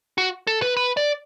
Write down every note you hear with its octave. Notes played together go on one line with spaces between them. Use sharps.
F#4
A4
B4
B4
D5